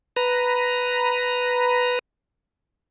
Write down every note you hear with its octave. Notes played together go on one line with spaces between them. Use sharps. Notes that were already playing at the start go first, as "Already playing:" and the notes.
B4 A#5